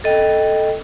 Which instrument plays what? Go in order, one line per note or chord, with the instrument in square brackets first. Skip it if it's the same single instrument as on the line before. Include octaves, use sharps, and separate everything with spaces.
[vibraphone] A4 D#5 G5